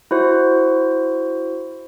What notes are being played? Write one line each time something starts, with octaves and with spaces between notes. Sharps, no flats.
E4 F#4 C5